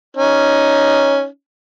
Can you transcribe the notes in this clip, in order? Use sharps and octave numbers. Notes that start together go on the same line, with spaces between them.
C#4 D#4